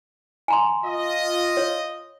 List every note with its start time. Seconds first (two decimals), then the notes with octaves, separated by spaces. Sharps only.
0.48 G#5 A#5 C6
0.84 F4 D#5
1.57 C#5